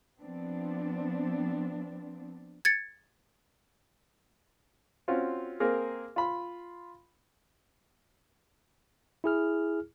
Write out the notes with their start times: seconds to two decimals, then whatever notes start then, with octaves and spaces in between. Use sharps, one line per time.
0.21 F3 B3 C4 D4
2.65 G#6 A6 C#7
5.08 C4 C#4 F4 F#4
5.60 A#3 C4 G#4 A#4
6.16 F4 B5
9.24 E4 G#4 F6